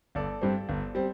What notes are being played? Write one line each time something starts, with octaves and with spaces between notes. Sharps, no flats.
G1 A4 D5
G2 G3 C4
G1
G3 C4